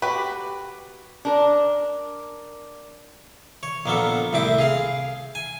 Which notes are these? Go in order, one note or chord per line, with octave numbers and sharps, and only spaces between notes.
F#4 G4 B4
D4 A#4
C#5
A#1 A#3 B3 A4
C2 A2 C4 E4 D6
G#4 F5
G#5